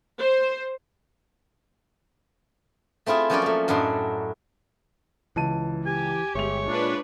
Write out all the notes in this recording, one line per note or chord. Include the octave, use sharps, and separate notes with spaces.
C5
A3 C4 E4 F4 G#4
F3 F#3 C#4 A#4 C#5 D5
A3 A#3
F#2 A2 A3 D4 D#5 C6
C#2 E3 A5 D#7
G4 G#5
G1 G#3 C#5 E5 F7
A#2 D4 F4 B4